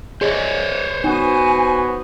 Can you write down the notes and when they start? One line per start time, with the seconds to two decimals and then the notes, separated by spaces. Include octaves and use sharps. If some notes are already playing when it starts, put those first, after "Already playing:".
0.21 G#4 C5 C#5 D#5
1.04 B3 D#4 F#4 G#5